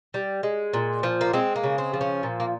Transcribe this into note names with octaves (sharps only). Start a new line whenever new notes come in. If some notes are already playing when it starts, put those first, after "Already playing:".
G3
G#3
A#2
F3
A#3
G#3 C4
A#3
C#3
C4
F3
C#4
A#2
A#3